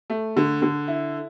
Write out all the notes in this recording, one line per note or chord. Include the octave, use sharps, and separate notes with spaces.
A3
D3
D3
E4